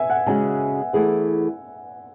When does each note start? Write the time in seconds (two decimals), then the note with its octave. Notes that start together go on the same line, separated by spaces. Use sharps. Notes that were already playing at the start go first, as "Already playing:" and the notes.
Already playing: E5 G#5
0.10 F#5
0.26 C#3 G#3 C#4 F#4 G#5
0.93 E3 A3 E4 G#4 B4